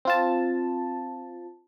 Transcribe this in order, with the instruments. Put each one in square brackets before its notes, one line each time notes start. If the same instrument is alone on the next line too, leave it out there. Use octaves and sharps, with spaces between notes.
[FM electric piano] C4 F4 A5